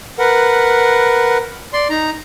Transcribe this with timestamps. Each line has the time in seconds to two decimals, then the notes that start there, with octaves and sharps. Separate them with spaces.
0.19 A#4 B4 F#5
1.73 D5 C6
1.90 D#4 A#5